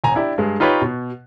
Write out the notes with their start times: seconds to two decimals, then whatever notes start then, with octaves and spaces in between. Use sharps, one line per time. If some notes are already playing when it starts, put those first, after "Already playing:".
0.04 E1 G#5 A#5
0.15 D4 E4 G4
0.38 G2 G#3
0.60 D#4 F4 G4 B4 C#5
0.82 B2